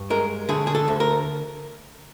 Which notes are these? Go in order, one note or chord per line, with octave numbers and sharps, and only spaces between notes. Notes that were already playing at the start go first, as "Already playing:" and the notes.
Already playing: G2
G#3 A#4
D3 G#4
G#4
A4
D2
A#4